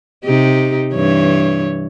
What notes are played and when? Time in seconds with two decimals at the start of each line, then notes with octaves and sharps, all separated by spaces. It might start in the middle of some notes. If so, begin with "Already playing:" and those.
0.25 C3 D#4 G4
0.94 G2 E3 C#5